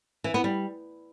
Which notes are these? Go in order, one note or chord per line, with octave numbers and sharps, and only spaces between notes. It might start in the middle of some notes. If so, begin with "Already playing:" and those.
E3
B3
G3